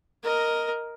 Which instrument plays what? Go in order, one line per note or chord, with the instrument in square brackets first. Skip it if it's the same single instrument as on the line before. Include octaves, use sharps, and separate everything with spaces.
[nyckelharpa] A#4 D#5